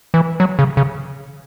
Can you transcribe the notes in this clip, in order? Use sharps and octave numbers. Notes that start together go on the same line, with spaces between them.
E3
F#3
C#3
C#3